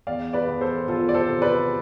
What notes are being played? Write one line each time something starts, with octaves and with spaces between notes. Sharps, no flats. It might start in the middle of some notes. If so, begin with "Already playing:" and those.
E2 D5 F5
B4 D5
E2
A4 C5
E2 F4 A4
D5
A4 C5
C3
B4 D5